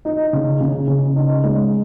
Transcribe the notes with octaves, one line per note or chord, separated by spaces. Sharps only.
D#4
C#3
C#3
C#3
D#4
G#3